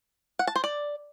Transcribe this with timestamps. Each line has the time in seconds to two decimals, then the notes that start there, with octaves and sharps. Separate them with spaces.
0.39 F#5
0.47 A5
0.56 C5
0.64 D5